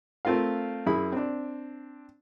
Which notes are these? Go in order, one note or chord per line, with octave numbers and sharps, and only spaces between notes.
A3 C4 F4 A#4 F5
F#2 E4 G#4 B5
C4 D4